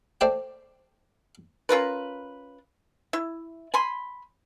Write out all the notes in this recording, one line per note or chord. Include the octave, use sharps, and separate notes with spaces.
A3 C5 D5 G5
C#4 F4 A#4 B4
E4
G#5 B5 C6